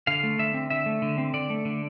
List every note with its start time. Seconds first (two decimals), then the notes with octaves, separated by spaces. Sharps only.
0.07 D3 F5
0.23 A3
0.39 D3 E5
0.54 C4
0.70 D3 E5
0.86 A3
1.02 D3
1.18 C4
1.34 D3 D5
1.50 A3
1.65 D3